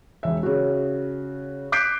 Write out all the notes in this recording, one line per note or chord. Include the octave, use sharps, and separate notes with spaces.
E1 E5
C#3 F#4
D6 F#6 G6 B6 C7 D7